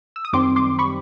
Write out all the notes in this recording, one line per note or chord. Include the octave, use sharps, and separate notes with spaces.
E6
D#6
F#2 D#3 G3 C4 C6 D6
C6 D6
B5 C#6